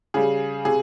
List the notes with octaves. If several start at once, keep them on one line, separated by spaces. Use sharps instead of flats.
C#3 G3 G#4
C3 G#4